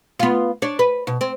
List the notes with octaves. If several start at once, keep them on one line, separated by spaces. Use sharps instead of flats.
B3 F4
D4 C#5
B4
B2
C4